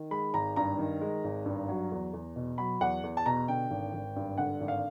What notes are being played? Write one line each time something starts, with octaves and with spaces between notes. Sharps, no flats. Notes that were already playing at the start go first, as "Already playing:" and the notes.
Already playing: D#3
G#3 B5
G#1 A#5
G2 A#5
D#3
G#3
G#1
G2
F#3
E2
E2
B2
F#3 B5
E2 F#5
E2
A5
B2 A#5
D3 G5
G#1
G#1
G2
D3 F#5
G#1
F5